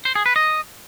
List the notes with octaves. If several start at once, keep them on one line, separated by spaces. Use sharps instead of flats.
C5
G#4
B4
D#5